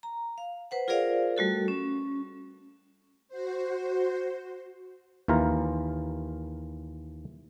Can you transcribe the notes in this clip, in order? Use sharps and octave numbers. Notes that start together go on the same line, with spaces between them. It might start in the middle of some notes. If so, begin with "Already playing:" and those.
A#5
F5
B4 C5 F#5
F4 G#4 A#4 C5 D5 F5
G3 A3 F#4 A4
C#4
F#4 C5
D#2 E3 F4 A#4 A#5